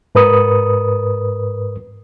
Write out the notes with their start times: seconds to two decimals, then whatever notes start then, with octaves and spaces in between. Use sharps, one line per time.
0.15 G#2 A#4 B4 D#6